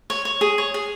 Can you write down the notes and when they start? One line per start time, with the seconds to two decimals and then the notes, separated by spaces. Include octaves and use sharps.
0.10 C#5
0.25 C#5
0.41 G#4
0.58 C#5
0.74 G#4